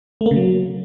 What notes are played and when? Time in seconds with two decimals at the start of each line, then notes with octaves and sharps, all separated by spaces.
0.21 A3
0.26 A#3
0.31 C#3
0.36 F#3